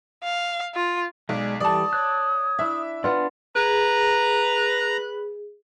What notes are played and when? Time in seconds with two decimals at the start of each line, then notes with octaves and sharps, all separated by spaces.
0.24 F5
0.75 F4
1.29 B1 G#3 D5
1.60 E3 G3 A4 D5 A5 D#6
1.93 C#5 F#6
2.59 D4 E4 E5
3.04 B3 D4 F4 D5
3.56 G#4 B4 A#5